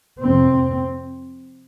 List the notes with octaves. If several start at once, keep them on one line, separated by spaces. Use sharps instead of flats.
F2 C3 C4